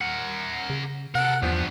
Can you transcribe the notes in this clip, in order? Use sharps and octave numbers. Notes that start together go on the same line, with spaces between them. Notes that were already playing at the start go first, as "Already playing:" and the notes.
A#4 F#5
C#3
C3 A4 A#4 F#5
E2 G2 F3 B3